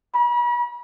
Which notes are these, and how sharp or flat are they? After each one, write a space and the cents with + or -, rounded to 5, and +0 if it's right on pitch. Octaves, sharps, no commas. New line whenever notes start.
B5 -40